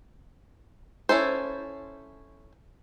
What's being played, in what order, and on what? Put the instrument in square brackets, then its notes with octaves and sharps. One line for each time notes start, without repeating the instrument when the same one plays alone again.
[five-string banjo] C#4 E4 A4 C5